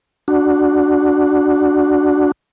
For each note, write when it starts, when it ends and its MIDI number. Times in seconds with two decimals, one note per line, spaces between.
0.28 2.32 62
0.28 2.32 66